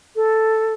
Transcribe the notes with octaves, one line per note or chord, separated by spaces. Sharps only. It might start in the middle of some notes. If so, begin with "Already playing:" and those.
A4